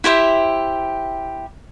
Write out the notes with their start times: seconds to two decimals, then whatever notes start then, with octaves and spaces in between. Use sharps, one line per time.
0.04 E4 G4 C5 E5